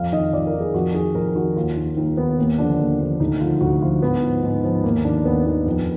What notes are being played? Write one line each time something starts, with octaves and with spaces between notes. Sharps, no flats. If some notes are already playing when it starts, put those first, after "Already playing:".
Already playing: F2 F5
D#3 D#5
F2 D5
A#4
D#3
G#4
F2 F#4
D#3 G#4
F2 A#4
D#3 F#4
D#2 F4
D#3
D#2 D#4
D#3 B3
D#2 A#3
D3 F3 D4
D#2
D3 F3
D2 D#4
D3 F3 F4
D2 F#4
D3 F3 F4
G#2 B3
F3
G#2
F3
D#2 A#3
D#3 D4
D#2 B3
D#3 B3
F2